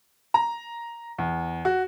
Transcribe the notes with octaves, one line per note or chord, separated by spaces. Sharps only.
A#5
E2
F#4